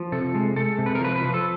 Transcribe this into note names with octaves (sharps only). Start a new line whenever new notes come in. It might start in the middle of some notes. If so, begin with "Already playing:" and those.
Already playing: F3
C3 A4
G#3
G#3 A4
C3
B4
A#4
F3 B4
B4
F3
A4